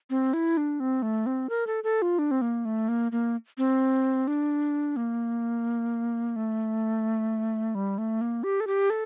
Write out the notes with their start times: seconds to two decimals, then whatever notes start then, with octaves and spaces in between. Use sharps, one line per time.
0.10 C4
0.33 E4
0.57 D4
0.80 C4
1.02 A3
1.26 C4
1.50 A#4
1.67 A4
1.84 A4
2.02 F4
2.19 D4
2.31 C4
2.42 A#3
2.65 A3
2.88 A#3
3.12 A#3
3.58 C4
4.27 D4
4.96 A#3
6.36 A3
7.75 G3
7.98 A3
8.21 A#3
8.43 G4
8.60 A4
8.67 G4
8.90 A4